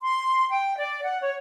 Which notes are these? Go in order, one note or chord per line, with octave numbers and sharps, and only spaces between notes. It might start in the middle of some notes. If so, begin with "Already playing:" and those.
C6
G5
D5
F#5
C#5